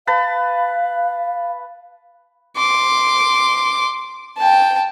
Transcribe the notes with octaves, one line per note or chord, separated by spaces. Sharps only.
B4 F5 A5
C6 D6
G5 A5